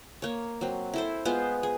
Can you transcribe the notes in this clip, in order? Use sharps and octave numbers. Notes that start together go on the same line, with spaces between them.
A#3 C#5
F#3 C4
E4 A4 C5
G#3 B3 F4 C5
G#4